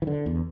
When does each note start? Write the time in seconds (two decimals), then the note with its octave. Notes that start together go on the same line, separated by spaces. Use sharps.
0.02 E3
0.07 D3
0.26 E2